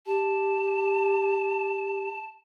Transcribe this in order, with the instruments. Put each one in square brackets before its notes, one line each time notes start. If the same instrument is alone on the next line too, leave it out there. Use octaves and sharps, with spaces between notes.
[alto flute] G4 [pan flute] A5